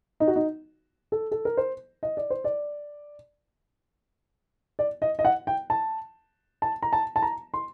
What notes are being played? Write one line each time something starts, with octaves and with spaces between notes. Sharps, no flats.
D#4
F#4
D#4
A4
A4
A#4
C5
D#5
D5
C5
D5
D5
D#5
D#5
F#5
G5
A5
A5
A#5
A5
A5
A#5
C6